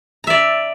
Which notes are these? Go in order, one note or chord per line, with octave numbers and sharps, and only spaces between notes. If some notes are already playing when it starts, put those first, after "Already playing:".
D5 E5 A#5